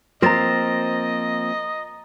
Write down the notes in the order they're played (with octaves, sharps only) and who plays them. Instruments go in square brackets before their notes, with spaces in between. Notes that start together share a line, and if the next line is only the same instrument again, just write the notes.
[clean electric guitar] F3 A#3 C4 [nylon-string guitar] C5 [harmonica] D#5 [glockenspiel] A#5 A6 A#6